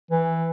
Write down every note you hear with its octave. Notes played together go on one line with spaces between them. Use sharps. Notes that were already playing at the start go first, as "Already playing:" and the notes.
E3